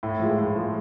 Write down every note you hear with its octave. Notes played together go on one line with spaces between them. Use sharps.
A2
F3 G#3
A2
F3 G#3